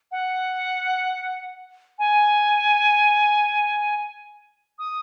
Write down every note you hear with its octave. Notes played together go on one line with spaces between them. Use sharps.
F#5
G#5
D#6